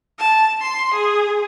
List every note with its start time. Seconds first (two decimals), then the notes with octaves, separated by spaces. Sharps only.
0.19 A5
0.61 C6
0.93 G#4